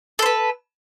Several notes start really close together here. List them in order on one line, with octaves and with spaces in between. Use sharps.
A4 C5 B4